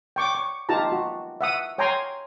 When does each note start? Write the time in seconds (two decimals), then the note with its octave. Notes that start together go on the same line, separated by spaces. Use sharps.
0.16 G5 C#6 D6
0.35 C#6
0.69 D#4 F4 G4 A5 A#5
0.92 F#4
1.41 E5 F#5 D#6
1.78 C#5 G5 G#5 A#5 C6